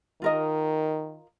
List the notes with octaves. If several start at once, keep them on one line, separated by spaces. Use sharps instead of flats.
D#3 F4 A#4 D#5